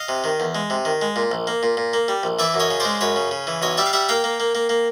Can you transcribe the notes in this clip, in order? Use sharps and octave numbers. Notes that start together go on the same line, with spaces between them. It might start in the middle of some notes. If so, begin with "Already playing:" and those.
Already playing: D#5 F5
C3
D#3
E2
G#3
C3
D#3
G#3
A#2
A#1
A#3
A#2
A#2
A#3
G3
A#1
E3 D5 E5
F#2
C#5 D#5
C#3
G#3 C5 D5
F#2 B4 C#5
C#3
C#3
E3
B1 C#5 D#5
G3 D5 E5
F5
G3 E5 F#5
A#3 F5 G5
A#3
A#3
A#3
A#3